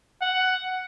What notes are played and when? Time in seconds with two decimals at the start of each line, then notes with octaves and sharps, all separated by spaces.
0.22 F#5